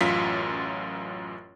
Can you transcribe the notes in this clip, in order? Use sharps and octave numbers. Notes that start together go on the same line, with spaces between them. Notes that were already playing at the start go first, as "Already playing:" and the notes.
A1 F#2 F4 B6